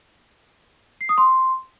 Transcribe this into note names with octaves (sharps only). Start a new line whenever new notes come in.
C7
D#6
C6